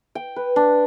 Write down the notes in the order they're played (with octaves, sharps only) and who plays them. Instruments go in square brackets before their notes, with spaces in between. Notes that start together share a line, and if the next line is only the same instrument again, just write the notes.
[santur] G5
B4
D4